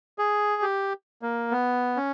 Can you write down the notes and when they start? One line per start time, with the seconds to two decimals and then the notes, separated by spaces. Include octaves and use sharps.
0.18 G#4
0.62 G4
1.22 A#3
1.51 B3
1.96 C#4